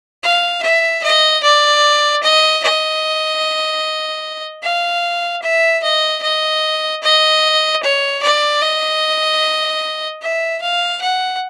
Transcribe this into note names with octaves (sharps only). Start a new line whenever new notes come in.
F5
E5
D#5
D5
D#5
D#5
F5
E5
D#5
D#5
D#5
C#5
D5
D#5
E5
F5
F#5